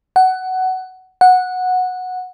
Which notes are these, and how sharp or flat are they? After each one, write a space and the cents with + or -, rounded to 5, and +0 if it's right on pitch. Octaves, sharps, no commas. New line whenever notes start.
F#5 +15
F#5 -10